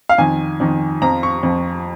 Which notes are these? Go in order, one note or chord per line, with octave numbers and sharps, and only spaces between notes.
F5
F2 D#3 G#5
F2 D#3
F2 F3 A#5
C#6
F2 F3